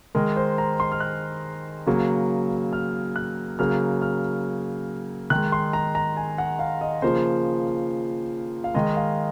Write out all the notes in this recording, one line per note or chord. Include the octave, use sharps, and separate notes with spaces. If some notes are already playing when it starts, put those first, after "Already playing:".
D#3 G#3 A#4
C5
A#5
C6
F6
F#6
C#3 F#3 A#3
F6
F#6
C#3 F#3 A#3 F6
F6
D#3 G#3 F#6
C6
A#5
A#5
G#5
F#5
F5
D#5
C#3 F3 A#3 C5
F5
D#3 G#3 D#5
F5